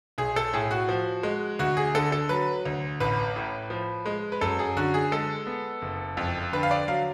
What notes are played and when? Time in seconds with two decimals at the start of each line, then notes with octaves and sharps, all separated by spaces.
0.18 B1 G#4
0.36 A4
0.53 A2 G#4
0.71 F#4
0.89 F3
1.23 G#3
1.59 D2 F#4
1.77 G#4
1.95 D3 A4
2.12 A4
2.29 F#3 B4
2.66 D2
3.00 A1 B4
3.36 A2
3.70 F3
4.06 G#3
4.32 B4
4.41 F#2 A4
4.59 G#4
4.77 D3 F#4
4.94 G#4
5.12 G#3 A4
5.47 B3
5.82 F#1
6.17 F2
6.52 D3 B4
6.63 F5
6.71 D5
6.88 F#3 F5